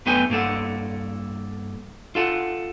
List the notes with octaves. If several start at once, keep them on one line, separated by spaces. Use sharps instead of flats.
F#2 A3 B3 B4 G5 G#5
G2 A#3 A4 F#5
F4 A4 F#5